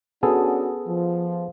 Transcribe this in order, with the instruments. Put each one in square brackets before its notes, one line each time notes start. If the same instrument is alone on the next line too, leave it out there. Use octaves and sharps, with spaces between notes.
[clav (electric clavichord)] B3 G#4 A4 [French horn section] C#4 D4 F#4
[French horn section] F3